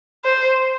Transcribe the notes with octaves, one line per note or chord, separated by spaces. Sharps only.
C5